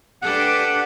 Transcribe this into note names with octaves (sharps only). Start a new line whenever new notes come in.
D4 G4 A4 B4 F#5